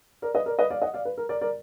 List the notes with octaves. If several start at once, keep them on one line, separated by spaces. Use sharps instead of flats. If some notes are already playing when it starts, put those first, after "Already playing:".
A#4 D5
B4 D#5
A#4 D5
B4 D#5
D5 F5
D#5 F#5
D5 F5
B4
A#4
A#4 D5
A#4 D5